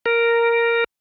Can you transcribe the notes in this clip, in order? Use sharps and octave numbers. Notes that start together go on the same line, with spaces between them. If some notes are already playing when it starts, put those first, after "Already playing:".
A#4